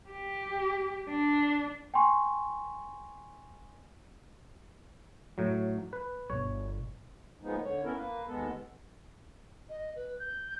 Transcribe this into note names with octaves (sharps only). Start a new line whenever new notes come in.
G4
D4
G5 G#5 C6 C#6
A2 F#3
B4
G1 B2 C#5
A#2 F3 G#3 B3 D#4
D3 C#5
B3 C#4 E4 A4 A#4
A#3 B4
D#2 G#3 B3 A4
D#5
B4
G6